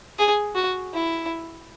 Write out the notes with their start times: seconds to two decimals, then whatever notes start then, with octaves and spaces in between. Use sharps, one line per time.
0.19 G#4
0.55 F#4
0.94 E4